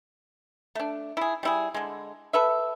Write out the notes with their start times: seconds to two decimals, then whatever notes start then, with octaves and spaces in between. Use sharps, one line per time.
0.75 A3 D4
1.17 E4 G#4
1.43 G3 E4 G#4
1.74 D3 G#3
2.33 A4 B4 E5